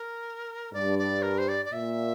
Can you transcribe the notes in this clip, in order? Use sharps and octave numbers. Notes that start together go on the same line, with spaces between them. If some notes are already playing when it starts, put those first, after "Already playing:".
Already playing: A#4
G2 D5
D5
A#4
C5
D5
D5
A#2 E5